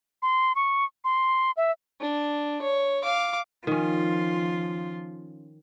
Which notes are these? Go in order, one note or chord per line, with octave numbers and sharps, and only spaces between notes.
C6
C#6
C6
E5
D4
C#5
F5 D6
D#3 F3 C#4 F4